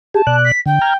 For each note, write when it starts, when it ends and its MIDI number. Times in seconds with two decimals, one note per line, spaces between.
0.14 0.22 67
0.14 0.22 68
0.14 0.36 81
0.27 0.52 47
0.27 0.52 74
0.27 0.52 90
0.44 0.59 95
0.66 0.79 50
0.66 0.94 79
0.81 0.93 82
0.81 0.93 89
0.81 0.93 92